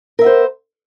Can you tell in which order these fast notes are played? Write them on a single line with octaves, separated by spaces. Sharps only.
A#4 E5 B3 C5